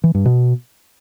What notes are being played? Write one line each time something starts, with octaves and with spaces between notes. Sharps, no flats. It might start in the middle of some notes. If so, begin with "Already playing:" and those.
E3
G2
B2